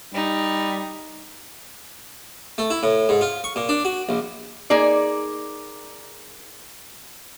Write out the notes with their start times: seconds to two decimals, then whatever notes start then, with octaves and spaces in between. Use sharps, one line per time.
0.14 G3 D#4
2.58 A3
2.70 E4
2.83 A2
3.09 G#2
3.21 F4
3.44 C#6
3.56 A#2
3.69 D4
3.85 F#4
4.09 A#1
4.70 A#3 D#4 G#4 D5